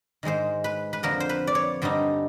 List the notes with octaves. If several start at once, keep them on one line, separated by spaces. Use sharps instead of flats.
G#2 D#3 G#3 C5
B4
B4
F2 D3 F3 A#4
C5
B4
D5
C#5
G2 D3 G3 C4 D#4